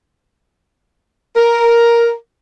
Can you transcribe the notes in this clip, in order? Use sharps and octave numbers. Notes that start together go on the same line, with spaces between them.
A#4